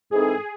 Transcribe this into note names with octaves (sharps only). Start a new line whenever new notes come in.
G#2 E3 C4 D#4 G#4 A4